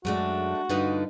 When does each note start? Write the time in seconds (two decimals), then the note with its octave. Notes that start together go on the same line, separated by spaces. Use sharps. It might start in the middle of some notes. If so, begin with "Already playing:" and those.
0.05 F#2 G#3 A3 D4 F#4
0.69 G2 D3 D#4 F4 B4 D#5